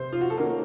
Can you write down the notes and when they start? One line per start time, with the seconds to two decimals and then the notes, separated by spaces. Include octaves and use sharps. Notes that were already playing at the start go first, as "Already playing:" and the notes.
Already playing: C3 C5
0.13 F4
0.21 F#4
0.30 A4
0.38 D#3 A#3 C#4 A#4